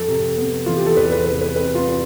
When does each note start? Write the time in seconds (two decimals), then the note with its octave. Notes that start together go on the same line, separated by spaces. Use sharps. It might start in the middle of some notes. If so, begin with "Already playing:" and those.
Already playing: F2 A4
0.08 C3
0.37 B3
0.66 E3 F4
0.77 G4
0.86 A4
0.97 E2 B4
1.12 B4
1.26 C3 B4
1.41 B4
1.55 C4 B4
1.75 F4
1.85 G3